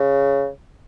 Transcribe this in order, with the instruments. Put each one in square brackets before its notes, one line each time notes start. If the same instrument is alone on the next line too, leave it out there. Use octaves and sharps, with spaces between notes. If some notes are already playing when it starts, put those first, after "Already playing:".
Already playing: [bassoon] C#3